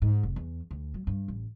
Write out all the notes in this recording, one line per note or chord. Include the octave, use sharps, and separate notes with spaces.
G#2
F1
E2
D2
F#3
G2
A1